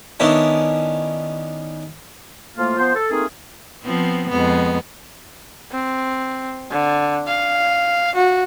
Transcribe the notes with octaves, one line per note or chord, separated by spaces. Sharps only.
D#3 B3 C#4 D4 E4
A2 F3 A3 A#3 F4
F3 B3 C5
A4
A3 A#3 C4 D#4 F4 G#4
F3 B3 C4
F2 G#3 B3
C4
D3
F5
F#4